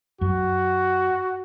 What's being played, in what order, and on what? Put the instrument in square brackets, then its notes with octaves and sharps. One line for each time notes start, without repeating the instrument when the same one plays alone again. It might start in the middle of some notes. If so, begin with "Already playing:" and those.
[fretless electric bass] F#2 [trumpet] F#4